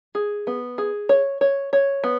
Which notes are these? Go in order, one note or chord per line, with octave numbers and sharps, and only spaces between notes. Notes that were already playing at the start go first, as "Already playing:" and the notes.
G#4
B3
G#4
C#5
C#5
C#5
B3